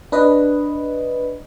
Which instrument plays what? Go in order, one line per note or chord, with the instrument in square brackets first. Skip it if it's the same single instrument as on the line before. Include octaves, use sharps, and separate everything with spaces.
[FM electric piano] D4 B4 D#5